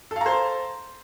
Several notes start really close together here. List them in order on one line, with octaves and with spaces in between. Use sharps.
A4 F5 A#5 C5